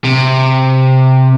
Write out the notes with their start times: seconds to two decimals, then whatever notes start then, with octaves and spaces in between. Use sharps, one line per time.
0.04 C3